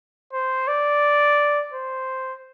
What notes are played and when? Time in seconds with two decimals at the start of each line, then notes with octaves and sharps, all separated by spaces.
0.33 C5
0.68 D5
1.73 C5